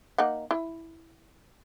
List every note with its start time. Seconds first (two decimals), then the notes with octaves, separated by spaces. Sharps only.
0.18 A#3 D#4 F#5
0.51 E4